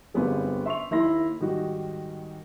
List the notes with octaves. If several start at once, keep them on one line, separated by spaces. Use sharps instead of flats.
G1 F#2 G3 B3 C4 G#4
E5 C6 C#6 F7
D#2 A#3 E4 C6 A#6
G#2 D#3 G3 D#4 F#4